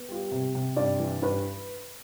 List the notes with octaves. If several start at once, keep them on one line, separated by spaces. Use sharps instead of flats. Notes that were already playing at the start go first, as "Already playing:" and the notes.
Already playing: B3
G3 F4
G4
C3
C3
G2 D5
E3
G2 B4